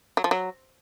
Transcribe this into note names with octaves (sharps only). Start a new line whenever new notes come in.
F#3
F3
F#3